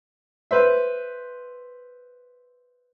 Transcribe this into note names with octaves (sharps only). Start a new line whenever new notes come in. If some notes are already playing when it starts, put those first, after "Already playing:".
B4 C5 E5